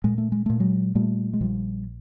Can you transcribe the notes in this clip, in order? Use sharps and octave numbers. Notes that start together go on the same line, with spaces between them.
A#2 G#3
A3
G#3
A#2 A3
F#3 G#3
A#2 G3 A3
G#3
A#1 F3 G3